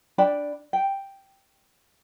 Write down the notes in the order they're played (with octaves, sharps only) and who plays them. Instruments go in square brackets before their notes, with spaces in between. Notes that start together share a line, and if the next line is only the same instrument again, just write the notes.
[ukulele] D4 D5 G5 B5
G5